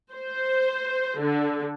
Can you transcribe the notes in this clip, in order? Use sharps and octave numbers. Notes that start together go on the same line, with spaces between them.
C5
D3